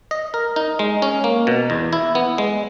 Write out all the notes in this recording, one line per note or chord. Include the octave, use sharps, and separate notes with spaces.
D#5
A#4
D#4
G#3
C#4
A#3
B2
E2
E4
B3
G#3